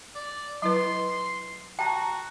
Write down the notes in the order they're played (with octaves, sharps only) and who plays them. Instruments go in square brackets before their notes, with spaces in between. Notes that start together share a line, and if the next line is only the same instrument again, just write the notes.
[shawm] D5
[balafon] F#3 E4 B4 [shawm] C6
[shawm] F#4 [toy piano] G5 A5 A#5